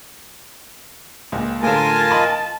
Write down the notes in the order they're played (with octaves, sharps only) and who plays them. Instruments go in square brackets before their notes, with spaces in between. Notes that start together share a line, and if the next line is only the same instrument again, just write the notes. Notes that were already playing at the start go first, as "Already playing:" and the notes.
[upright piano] C#2 A#2
[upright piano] A2 D3 [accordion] F4 A#4 G#5 [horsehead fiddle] A5
[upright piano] D#5 B5 C6